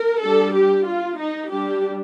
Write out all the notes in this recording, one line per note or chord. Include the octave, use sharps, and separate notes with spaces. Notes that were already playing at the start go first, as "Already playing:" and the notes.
Already playing: A#4
G3 D4 A4
G4
F4
D#4
G3 D4 G4